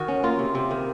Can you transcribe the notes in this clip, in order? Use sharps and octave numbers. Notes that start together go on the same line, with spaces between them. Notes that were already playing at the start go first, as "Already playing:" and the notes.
Already playing: D#3 D#4 F#4
C#4
A#3 F4
C3
C3
D#3